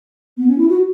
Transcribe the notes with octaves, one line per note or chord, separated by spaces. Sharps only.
B3
C#4
E4
F#4